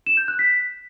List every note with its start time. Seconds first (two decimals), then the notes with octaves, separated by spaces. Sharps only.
0.06 E7
0.17 G6
0.28 F#6
0.39 B6